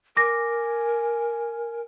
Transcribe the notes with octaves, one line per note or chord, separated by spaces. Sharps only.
A#4 G#5 D6 A#6